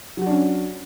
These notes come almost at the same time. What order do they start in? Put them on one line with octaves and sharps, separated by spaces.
F#3 F#4 D4 C#4